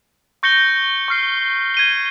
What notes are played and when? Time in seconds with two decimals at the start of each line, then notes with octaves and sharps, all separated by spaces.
0.43 C#6 G6 A#6 C#7 G7
1.08 C#6 F6 C7
1.74 G#6 D#7 G7